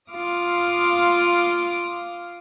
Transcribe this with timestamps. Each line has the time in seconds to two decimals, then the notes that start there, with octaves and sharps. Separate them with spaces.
0.11 F4 F5 C6 D6 D#6 F6